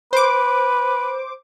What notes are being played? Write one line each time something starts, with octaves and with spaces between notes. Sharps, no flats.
B4 C5 D6